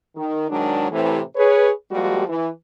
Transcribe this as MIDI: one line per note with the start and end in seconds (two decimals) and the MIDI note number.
0.16 0.46 51
0.49 0.90 44
0.49 0.90 51
0.49 0.90 54
0.49 0.90 56
0.49 0.90 62
0.91 1.20 45
0.91 1.20 48
0.91 1.20 52
1.36 1.70 68
1.36 1.70 71
1.36 1.70 73
1.91 2.26 53
1.91 2.26 55
1.91 2.26 56
1.91 2.26 58
1.91 2.26 66
1.91 2.26 67
2.28 2.48 52